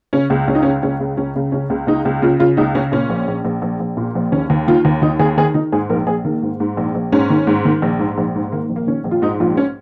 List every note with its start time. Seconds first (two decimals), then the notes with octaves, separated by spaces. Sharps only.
0.13 C#3 C#4
0.30 C#2
0.48 C#2 C#4
0.55 D#4
0.62 C#4
0.65 C#3
0.83 C#2 C#4
1.00 C#3
1.17 C#2 C#4
1.36 C#3
1.52 C#3 C#4
1.70 C#2
1.87 C#2 D#4
2.05 C#2
2.22 C#3 F4
2.39 C#3 F4
2.57 C#2 D#4
2.75 C#3 C#4
2.92 A#2 C#4
3.10 A#1
3.28 A#1
3.45 A#1
3.62 A#1
3.80 A#1
3.97 A#2
4.15 A#1
4.32 D#2 C#4
4.50 D#2
4.68 D#3 F4
4.85 D#2
5.02 D#2 D#4
5.19 D#2 G#4
5.37 D#3 G#4
5.54 D#3 D#4
5.72 G#2 G#4
5.90 A#1 A#4
6.07 A#1 G#4
6.25 D#3 A#3
6.42 G#2
6.60 G#2
6.77 A#1
6.95 A#1
7.12 G#2 C#4
7.30 D#3
7.47 G#2
7.65 D#3
7.82 A#1
7.99 G#2
8.18 A#1
8.35 G#2
8.52 D#3 A#3
8.69 A#1
8.76 A#3
8.87 D#3 C#4
9.04 A#1
9.11 F4
9.22 G#2 D#4
9.40 A#1 F4
9.57 C#4